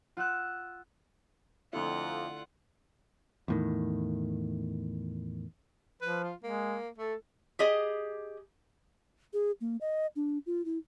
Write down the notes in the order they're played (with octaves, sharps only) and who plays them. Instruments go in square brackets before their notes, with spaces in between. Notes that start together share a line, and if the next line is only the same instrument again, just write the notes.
[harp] F4 F#5 E6 F#6
[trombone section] F2 [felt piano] D3 A3 E4 [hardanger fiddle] F4 F#5
[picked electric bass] E2 A2 D#3
[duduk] F3 [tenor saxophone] B4
[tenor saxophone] F4
[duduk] G#3 [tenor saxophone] A#3
[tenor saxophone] A3 [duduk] A4
[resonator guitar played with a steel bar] G4 G#4 D#5
[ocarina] G#4
A#3
D#5
D4
F4
E4